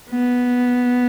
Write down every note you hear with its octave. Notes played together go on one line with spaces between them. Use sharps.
B3